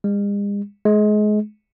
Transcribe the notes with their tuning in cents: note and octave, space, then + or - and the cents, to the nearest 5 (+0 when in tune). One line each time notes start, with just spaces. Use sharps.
G#3 -45
G#3 +25